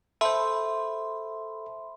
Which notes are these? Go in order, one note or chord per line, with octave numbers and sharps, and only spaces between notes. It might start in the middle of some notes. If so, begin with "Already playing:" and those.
A4 C5 E5 B5 C6